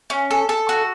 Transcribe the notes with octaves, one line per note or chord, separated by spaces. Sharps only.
C#4
A4
A4
F#4